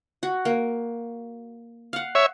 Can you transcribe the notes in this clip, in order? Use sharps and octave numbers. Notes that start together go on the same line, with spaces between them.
F#4
A#3
F5 F#5
C#5 E5